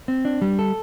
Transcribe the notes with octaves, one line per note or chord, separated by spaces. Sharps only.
C4
D4
G3
A4